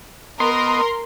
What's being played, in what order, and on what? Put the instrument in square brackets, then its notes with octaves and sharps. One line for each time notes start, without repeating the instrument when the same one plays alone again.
[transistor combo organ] B3 D#5 [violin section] A#4 [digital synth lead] C6